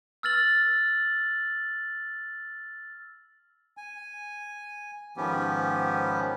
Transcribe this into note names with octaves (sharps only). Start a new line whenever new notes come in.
E6 F6 A6 F#7
G#5
G#2 D#3 F3 B3 C#4 G4